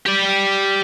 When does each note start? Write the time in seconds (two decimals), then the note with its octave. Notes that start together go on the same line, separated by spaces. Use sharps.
0.06 G4 D5